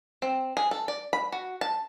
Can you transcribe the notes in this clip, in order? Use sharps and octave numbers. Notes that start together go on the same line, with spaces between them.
C4
G#4
A4
D5
B5
F#4
A5